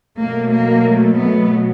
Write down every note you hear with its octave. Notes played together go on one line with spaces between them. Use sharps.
B2 F#3 A3 A#3
A#3
A3
A3 B3